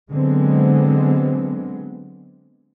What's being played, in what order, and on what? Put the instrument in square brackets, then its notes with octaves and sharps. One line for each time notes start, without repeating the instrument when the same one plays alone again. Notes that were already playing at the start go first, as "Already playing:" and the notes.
[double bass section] D3 F#3 G#3 B3 C4